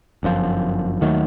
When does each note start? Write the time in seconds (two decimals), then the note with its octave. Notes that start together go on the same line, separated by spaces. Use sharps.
0.23 G1 F#2 C#3 F3
1.01 D#2 D#3 F#3 A3